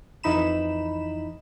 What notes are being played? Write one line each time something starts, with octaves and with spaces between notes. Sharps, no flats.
F2 E3 D#4 B5 E7